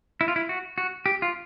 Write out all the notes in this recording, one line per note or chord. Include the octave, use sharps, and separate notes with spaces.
E4
F4
E4
F#4
F#4
G4
F4